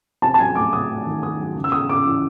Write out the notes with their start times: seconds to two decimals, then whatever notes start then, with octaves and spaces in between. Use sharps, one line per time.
0.22 C3 A5
0.34 A5
0.39 F#3 G#5
0.55 A3 D6
0.73 C3 D#6
0.89 A3
1.06 D#3
1.23 D#3 D#6
1.39 F#3
1.55 C#3
1.64 E6
1.72 C#3 D#6
1.89 C#3 D6
2.06 E3